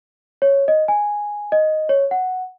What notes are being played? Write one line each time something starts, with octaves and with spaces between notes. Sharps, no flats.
C#5
D#5
G#5
D#5
C#5
F#5